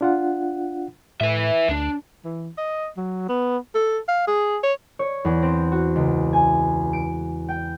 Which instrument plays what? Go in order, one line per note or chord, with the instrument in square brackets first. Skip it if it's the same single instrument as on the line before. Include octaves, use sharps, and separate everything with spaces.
[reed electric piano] D4 F4 F#5
[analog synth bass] A2 [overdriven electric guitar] B4 E5
[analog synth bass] D2 [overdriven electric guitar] D4
[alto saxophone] E3
D#5
F#3
B3
A4
F5
G#4
C#5
[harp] C#5
E2
C4
F#4
C#2
G#5
D7
G5